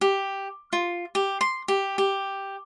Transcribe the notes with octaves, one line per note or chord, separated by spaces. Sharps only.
G4
F4
G4
C6
G4
G4